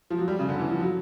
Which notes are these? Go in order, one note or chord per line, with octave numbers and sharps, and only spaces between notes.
F3
F#3
G3
C#3
D3
E3
F3
F#3